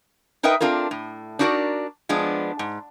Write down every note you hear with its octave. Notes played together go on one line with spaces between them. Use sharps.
D#4 A#4 B4 D#5 E5 G5
C4 D4 F4 A4 A#4
A2
D4 D#4 F#4 A#4 C5 D5
F3 G#3 B3 D4
G#2